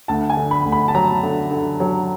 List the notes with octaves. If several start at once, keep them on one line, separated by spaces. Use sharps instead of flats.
D2 A5
G#5
D3
B5
D2
B5
A5
F#3 A#5
D3
D3
F#3